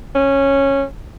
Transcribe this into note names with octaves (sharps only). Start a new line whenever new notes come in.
C#4